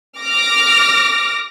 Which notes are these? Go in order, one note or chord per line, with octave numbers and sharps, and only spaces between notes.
D6 F6 A#6